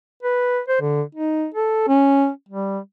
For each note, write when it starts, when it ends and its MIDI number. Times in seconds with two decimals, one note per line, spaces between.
0.23 0.60 71
0.68 0.80 72
0.81 1.02 50
1.15 1.46 63
1.54 1.84 69
1.88 2.29 61
2.49 2.79 55